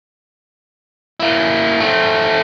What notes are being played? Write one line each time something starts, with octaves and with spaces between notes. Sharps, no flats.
A#3 E4
A3 C4